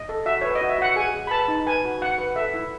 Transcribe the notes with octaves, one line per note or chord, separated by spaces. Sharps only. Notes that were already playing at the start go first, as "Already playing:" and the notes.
Already playing: D#5
A4
F#4 E5
B4 C#5
D#5
F#4
E5
F#4 F#5
G#4 G#5
G#4
B5
B4 A5
D#4
B4 G#5
F#4
F#4 F#5
B4
A4 E5
E4